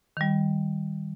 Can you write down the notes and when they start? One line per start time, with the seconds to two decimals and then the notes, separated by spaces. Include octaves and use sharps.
0.17 D#3 G3